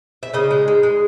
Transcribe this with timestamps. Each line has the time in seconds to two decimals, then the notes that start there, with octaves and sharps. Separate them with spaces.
0.23 E5
0.33 C#3 D#4 D#5
0.51 G#3
0.68 G#3
0.83 G#3